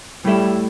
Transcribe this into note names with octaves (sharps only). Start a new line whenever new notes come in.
A2 G3 A3 E4